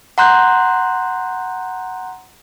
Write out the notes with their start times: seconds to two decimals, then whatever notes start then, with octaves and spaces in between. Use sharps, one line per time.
0.18 F#5 A#5 C6 F#6 G6